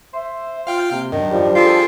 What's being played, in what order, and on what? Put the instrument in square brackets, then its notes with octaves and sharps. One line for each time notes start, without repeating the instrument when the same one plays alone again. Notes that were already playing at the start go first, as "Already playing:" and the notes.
[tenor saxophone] C5 [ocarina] E5
[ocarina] F4 [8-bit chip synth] F5 G5 F6
[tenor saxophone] C3 [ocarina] A#3
[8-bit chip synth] F#2 [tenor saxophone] D#3 [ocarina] D4
[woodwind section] F3 G3
[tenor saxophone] F4 [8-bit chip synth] G#4 A4 G5